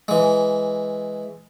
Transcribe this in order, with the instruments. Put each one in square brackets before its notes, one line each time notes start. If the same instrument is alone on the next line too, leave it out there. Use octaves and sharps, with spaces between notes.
[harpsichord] E3 G#3